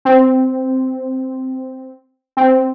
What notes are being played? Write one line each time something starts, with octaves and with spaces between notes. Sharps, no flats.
C4
C4